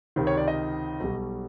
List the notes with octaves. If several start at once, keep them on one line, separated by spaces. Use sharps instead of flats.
C#2 C3 D#3
C#5
D5
D#5
B1 B2 G3